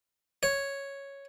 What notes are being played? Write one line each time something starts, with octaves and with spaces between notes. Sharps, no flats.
C#5